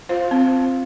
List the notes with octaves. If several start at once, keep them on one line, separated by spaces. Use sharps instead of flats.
F4 C5
C4